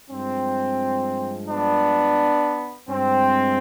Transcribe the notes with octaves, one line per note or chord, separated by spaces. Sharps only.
G2 F3 G#3 C4
B3 D4
G2 F3 G#3 C4